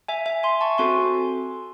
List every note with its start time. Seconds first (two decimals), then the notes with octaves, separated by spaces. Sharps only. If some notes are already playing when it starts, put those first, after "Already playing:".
0.08 E5 G#5
0.26 E5 G#5
0.43 G#5 C6
0.61 A5 C#6
0.78 C4 F#4 A4 G#5 C6